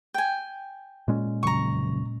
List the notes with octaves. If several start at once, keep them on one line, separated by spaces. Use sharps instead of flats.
G5 G#5
A#2 G#3 C#4
F1 C#3 F#3 A#5 C#6